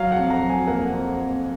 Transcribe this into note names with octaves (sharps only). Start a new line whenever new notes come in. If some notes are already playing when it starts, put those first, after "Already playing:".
Already playing: F#3 F5
F#5
F2
A#5
F#3
G#5
A#3 F#5
F2
F2